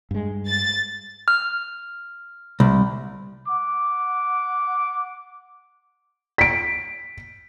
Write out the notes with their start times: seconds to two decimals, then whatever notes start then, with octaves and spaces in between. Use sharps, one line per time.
0.11 G2 G#3
0.48 A6
1.28 F6
2.60 C2
3.48 F#5 D6
6.38 B6 D7